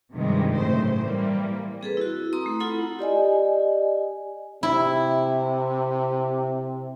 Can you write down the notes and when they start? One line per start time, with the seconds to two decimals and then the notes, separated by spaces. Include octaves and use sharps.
0.13 G2 C3 D#3 F3 G3 G#3
0.57 A2 C#3 F#3 C5
1.02 E3 G3 A#3
1.81 C4 G#4 A4 B4
1.97 E4 F#4
2.33 C4 A#5 C6 D#6
2.46 A3
2.60 E4 F4 A4 F#5 B5
2.99 G4 D5 D#5 G#5
4.63 C3 E4